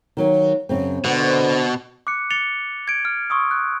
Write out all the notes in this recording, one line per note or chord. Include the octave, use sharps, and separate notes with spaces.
D#3 F#3 A#3
F#2 C#3 C4
B2 D3 C5 F#5
D6 F#6 C#7
D6 A6 C#7 F7 G7
G#6 D7
F6
C6 C#6 D#6 E6
F#6